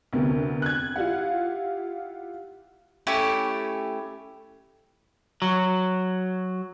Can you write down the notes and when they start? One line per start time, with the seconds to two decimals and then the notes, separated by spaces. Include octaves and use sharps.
0.13 D2 C3 B3 A#4
0.62 F#6 G#6
0.96 E4 F4 G4 F5 F#5
3.07 A3 C#4 E4 G4
5.42 F#3